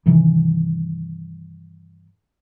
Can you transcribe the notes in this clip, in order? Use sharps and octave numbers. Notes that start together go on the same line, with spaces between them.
G2 C3 D#3 E3